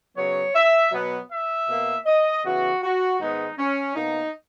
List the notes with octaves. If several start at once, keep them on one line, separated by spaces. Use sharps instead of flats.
C#3 F#3 B3 C#5
E5
B2 F#3 B3
E5
B2 A#3
D#5
C#3 E3 B3 F#4
F#4
G#2 D#3 G#3 B3 D#4
C#4
B2 A#3 D#4